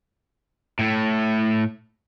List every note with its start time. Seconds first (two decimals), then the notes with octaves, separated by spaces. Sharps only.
0.79 A2 A3